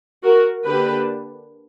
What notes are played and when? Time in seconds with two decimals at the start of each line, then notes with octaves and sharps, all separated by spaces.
0.24 F#4 A#4
0.65 D3 A#3 D4 G4 B4